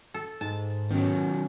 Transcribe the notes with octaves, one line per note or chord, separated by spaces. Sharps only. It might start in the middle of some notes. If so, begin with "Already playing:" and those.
A4
G#2 A5
D#3 F#3 B3 C#4